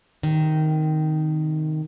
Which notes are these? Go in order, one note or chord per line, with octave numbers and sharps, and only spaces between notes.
C3 D#3